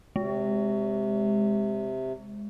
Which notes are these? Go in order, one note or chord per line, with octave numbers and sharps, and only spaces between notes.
C3 G#3